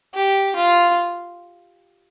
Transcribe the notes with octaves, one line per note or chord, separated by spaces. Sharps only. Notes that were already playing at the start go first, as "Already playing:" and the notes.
G4
F4